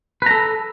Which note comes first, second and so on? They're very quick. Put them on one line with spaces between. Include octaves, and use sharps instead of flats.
B4 A#5 A4